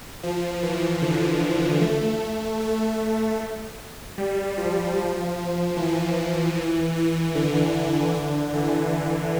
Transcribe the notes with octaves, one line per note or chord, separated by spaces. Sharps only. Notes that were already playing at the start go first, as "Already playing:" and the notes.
F3
E3
D3
A3
A3
G3
F3
F3
E3
E3
E3
D3
D3
E3
E3